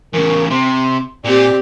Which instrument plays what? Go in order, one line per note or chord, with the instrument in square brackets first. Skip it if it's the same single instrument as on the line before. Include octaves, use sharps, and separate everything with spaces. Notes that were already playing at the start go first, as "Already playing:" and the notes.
[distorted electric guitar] E2 C#3 [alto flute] A#4
[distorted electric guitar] C3 [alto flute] C6
[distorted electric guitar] A#2 [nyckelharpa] C4 G4 [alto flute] D5